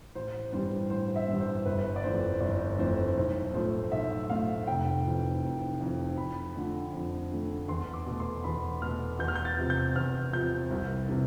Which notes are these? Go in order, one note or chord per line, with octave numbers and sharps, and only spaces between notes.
A1 C5
G2 E3 G3 C5
A1 C5
E5
G2 E3 G3
C5
G1 B4
D5
F2 E3 A3 C5
G1 D5
F2 E3 A3 C5
B1 C5
A2 F3 A3 C5
B1 E5
A2 F3 A3 F5
F1 G5
F2 E3
F1
F2 E3
F2 B5
D3 F3 A3
F2
D3 F3 A3
E2 C6
D6
B2 A3
C6
E2 B5
B2 A3 F6
E2 G6
F6
G6
A6
C3 F3
G6
E2 F6
C3 F3 G6
C2
C3 E3